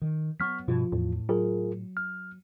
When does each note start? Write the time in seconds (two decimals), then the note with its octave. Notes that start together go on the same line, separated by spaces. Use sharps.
0.02 D#3
0.40 F#3 B3 C#6 F6 B6
0.68 G2 B2 F3 F4
0.92 E2 A2
1.29 F#3 F4 G#4 A#4
1.97 F6